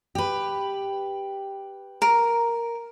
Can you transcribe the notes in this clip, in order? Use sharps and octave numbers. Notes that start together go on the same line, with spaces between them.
G4 B4
A#4